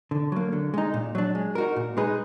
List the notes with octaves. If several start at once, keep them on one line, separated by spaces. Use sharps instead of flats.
D3
F#3 A#3
D3
G#3 D#4
A#2
F#3 D4
G#3
D#4 F#4 A#4
A#2
G#3 D#4 G#4 B4